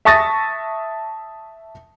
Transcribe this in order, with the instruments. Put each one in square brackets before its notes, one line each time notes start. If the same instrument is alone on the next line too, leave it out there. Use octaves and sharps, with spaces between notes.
[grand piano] E5 A5 C#6 D#6 A6 A#6